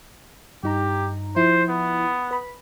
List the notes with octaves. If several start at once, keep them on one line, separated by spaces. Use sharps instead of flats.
G2 D#4 G4 A#5
F3 E4 C5
B3
B4 B5